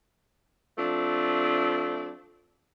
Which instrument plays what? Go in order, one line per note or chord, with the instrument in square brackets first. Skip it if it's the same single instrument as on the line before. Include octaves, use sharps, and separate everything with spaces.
[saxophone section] F3 A3 C4 D4